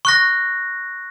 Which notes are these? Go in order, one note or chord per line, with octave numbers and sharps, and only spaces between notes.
C#6 F#6 A#6